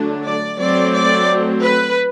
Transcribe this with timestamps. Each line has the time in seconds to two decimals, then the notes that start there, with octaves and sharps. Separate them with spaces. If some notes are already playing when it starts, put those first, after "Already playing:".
Already playing: D3 F#3 A3 D4
0.24 D5
0.58 F#3 A3 C4 D5
0.93 D5
1.62 B4